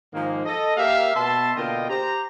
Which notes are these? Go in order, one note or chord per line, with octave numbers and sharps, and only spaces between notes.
G#2 D#3 F3 G#3 A#3
A4 D#5
A#3 G4 A#4 E5 F5
B2 B3 E5 A5 C6
B2 D3 A#3 F4 D#5 G5
G4 C5 A#5